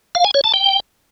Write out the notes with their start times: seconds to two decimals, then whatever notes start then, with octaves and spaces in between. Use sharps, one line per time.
0.15 F5
0.25 G#5
0.34 C#5
0.44 A5
0.54 G5